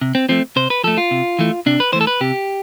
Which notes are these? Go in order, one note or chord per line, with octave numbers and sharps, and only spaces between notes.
C3
C4
F3 A3 C4
C3 C5
B4
F3 A3 A4
F4
C3
E3 A3
C3 D4
B4
E3 A3 C5
A4
B4
C3 G4